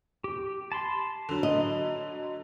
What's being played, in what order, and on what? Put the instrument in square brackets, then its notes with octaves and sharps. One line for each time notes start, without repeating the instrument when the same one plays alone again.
[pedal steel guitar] G4
A5 B5 C6
[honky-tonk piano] D3 F#3
[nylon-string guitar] D#5